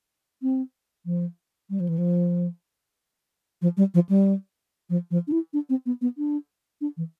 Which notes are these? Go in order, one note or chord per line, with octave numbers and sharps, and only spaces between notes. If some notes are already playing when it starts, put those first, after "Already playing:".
C4
F3
G3
F3
E3
F3
F3
G3
F3
G3
F3
F3
D4
E4
D4
C4
B3
B3
D4
D4
E3